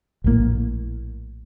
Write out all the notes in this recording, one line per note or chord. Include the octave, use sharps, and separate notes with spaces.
A#1 A2 F3 A#3